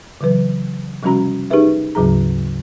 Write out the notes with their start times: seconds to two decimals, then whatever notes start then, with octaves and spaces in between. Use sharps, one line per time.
0.21 C#3 E3 F#3 B4
1.03 C3 F3 G3 C#4 F#4 A#5
1.50 D#4 G4 G#4 A#4 B4 E5
1.95 D2 G#2 C#3 F#3 G#4 A#5